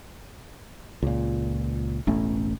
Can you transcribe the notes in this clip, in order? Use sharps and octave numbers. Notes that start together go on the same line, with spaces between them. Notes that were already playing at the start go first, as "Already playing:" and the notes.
C#2 A#2
E1 A1 A3 C#4